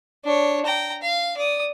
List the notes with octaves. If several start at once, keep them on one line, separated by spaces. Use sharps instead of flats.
D4 C#5
G5 A#5
F5
D5 D#6